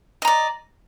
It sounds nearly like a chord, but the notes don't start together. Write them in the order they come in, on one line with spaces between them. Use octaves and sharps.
D#5 A#5 D5